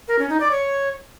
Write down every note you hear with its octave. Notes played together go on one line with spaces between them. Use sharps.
A#4
C#4
D#4
D5
C#5